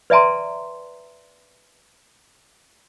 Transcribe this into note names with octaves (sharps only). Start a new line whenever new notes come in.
B4 D5 E5 G#5 A#5 C6